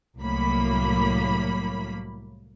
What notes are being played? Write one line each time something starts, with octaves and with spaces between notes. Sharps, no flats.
C2 A2 F#3 A#3 B5